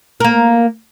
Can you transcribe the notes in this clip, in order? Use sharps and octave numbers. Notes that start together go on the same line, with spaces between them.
A#3 A#4